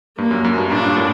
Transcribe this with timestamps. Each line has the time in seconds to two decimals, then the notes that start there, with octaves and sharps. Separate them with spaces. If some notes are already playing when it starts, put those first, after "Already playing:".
0.18 G2 A#3
0.31 F#2
0.44 F#2
0.58 G2
0.71 G2 A#2 D4
0.88 A#2
0.97 A2